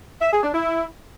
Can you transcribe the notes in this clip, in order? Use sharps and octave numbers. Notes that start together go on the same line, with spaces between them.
E5
G#4
D4
E4